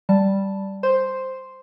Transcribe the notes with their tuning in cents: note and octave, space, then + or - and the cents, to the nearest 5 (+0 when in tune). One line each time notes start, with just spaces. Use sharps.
G3 -5 A5 +0
C5 +0 C6 +0